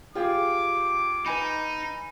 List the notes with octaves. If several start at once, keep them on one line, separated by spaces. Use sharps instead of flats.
F4 G4 G#4 D6
D#4 B4 G#5 B5